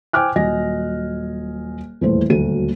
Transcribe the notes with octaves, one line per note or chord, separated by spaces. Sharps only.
C5 G5 G#5 D6 F6 F#6
D#1 F#3 D#5 G#5 A#6
D#1 E2 A2 A3 C5
D#1 D2 F#3 A4 D#7